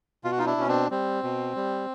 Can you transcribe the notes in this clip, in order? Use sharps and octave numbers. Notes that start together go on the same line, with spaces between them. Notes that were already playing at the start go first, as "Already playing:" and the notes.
B2 F4
F#4
D#4 F4
D4 E4
B2 C#4
C4 D4
G3 C4
B2
G3